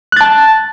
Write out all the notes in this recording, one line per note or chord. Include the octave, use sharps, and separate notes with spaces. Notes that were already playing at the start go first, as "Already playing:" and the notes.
A5 F#6 A6